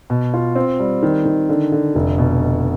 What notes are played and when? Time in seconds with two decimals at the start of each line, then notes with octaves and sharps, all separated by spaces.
0.10 B2
0.34 F4
0.56 C4
0.80 G3
1.03 D#3
1.25 D#3
1.49 D3
1.72 D3
1.95 F1
2.18 B2